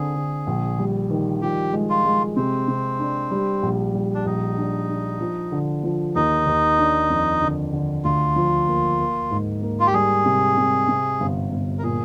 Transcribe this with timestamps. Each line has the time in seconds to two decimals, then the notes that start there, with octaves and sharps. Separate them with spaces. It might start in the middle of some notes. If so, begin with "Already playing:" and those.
Already playing: D3 C4 G#4
0.16 D3
0.47 A#1
0.78 G3
1.10 D#3
1.42 F3 G4
1.73 G#3
1.90 F4
2.05 G#3
2.36 C3 C4
2.68 C3
2.99 D4
3.31 G3
3.63 A#1
3.94 G3
4.15 D4
4.25 A#1 D#4
4.57 D4
4.89 D4
5.21 F3
5.52 D3
5.84 F3
6.15 D#2 D#4
6.46 D#2
6.79 D4
7.10 F2
7.42 D3
7.73 D3
8.04 D2 F4
8.36 F3
8.68 A#3
8.99 A#3
9.31 G#2
9.62 A#3
9.80 F4
9.87 G4
9.94 G3 G#4
10.25 C3
10.57 C3
10.88 C3
11.20 G1
11.52 G1
11.79 A#4
11.83 A#2 G#4